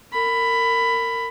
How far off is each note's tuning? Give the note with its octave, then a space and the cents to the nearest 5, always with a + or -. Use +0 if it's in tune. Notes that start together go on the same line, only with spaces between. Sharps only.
A#4 -25 B5 +10